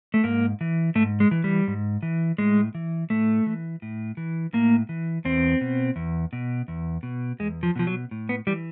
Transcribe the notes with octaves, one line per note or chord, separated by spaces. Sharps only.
A3
G#2 A#3
E3
G#2 A3
G#3
E3
G3
G#2
E3
A2 G#3
E3
A2 A3
E3
A2
E3
A2 A#3
E3
E2 C4
B2
E2
B2
E2
B2
E2 G#3
F3
B2 F3
F#3
A2
B3
E3 G3